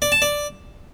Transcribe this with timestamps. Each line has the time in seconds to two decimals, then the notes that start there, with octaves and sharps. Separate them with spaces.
0.02 D5
0.12 A5
0.22 D5